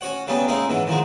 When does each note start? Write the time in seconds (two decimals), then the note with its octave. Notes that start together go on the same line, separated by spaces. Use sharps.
0.01 C#4 F#4 C#5 F#5
0.27 C#3 F#3 G3 B3 C#4
0.48 G#3 A#3 C#4 D#4 E4
0.69 G#2 E3 F#3
0.87 D#3 F3 F#3 G#3